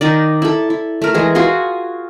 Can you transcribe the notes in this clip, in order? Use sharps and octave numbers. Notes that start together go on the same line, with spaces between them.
D#3 D#4 D5
E4 A4
E4
A3 A#4
E3 G#3 G#4
F4 F#4 G#4 C6